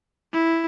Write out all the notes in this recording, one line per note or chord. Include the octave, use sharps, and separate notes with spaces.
E4